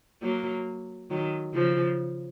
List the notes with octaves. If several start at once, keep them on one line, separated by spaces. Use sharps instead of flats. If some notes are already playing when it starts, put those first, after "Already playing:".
F#3 A#3
D#3 F#3
C#3 F3